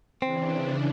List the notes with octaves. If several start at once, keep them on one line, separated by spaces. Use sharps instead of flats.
C#3 E3 C4 D4